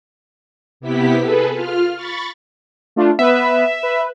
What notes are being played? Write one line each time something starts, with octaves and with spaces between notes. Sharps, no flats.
C3 B3 E4 G4 B6
G#4 A4 B4
F4 F6
B5 C#6 A6
A3 D4 F4
B3 B4 E5
B4